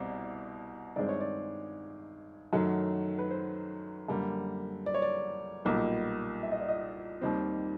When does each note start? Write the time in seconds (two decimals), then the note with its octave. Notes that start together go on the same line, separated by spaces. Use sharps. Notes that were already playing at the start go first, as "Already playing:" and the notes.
Already playing: C2 B2 G3 C4 D5
0.96 G2 D#3 G#3 C4 D5
1.09 C#5
1.21 D5
2.53 F#2 D#3 F#3 A3
3.19 B4
3.31 C5
4.08 F#2 D3 G3 A#3
4.86 D5
4.94 C#5
5.02 D5
5.65 B1 A#2 G3 A#3 D#4
6.43 E5
6.52 D#5
6.60 D5
6.68 D#5
7.21 D#2 D#3 G3 C4